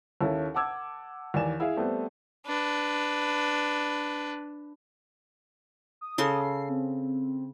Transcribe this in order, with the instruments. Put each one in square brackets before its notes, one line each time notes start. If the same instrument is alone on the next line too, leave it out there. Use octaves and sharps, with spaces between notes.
[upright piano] D#2 C#4 E4 A4
F#5 A5 D6 E6 G#6
D#2 E3 D5 G#5 E7
E4 G#4 F5
G3 A3 B3 C4
[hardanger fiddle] D4 B4
[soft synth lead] D#6
[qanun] C#3 A4 C6
[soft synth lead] C7
C4